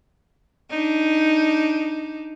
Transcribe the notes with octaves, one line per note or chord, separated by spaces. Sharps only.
D4 D#4